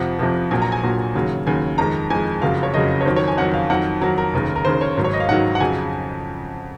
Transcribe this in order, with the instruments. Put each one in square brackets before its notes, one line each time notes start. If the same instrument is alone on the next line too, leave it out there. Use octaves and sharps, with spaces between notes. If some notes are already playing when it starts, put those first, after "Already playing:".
Already playing: [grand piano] F2 C3 F3 F#5
F2 C3 F3
A#1 A#2 F#3 G#5
A#5
G#5
A#1 A#2 F#3
D#2 C#3 F#3
D#2 C#3 F#3 G#5
F2 D#3 G#3 A#5
F2 D#3 G#3 G#5
F#1 F2 C#3 F#3 F5
C#5
F#1 F2 C#3 F#3 D#5
C#5
F2 D#3 F#3 C5
C#5
G#5
F2 D#3 F#3 F#5
F5
F2 D#3 F#3 F#5
F2 D#3 F#3 A#4
A#4
F1 D#2 C#3
A#4
F1 D#2 C#3 C5
C#5
G#1 G#2 D#3 F#3
C#5
D#5
F5
G#1 G#2 D#3 F#3 F#5
F#5
F2 C#3 F#3 G#5